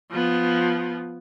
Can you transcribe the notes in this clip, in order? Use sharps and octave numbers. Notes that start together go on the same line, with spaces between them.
F3 B3